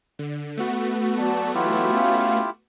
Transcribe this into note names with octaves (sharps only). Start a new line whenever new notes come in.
D3
A3 B3 F#4
F#3 D5 A5
E3 F#3 E4 F4 G4
C#4 F5